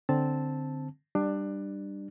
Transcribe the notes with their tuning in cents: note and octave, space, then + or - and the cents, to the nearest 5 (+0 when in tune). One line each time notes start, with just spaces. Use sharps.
D3 +0 C4 +0 A5 +0
G3 +0 D4 +20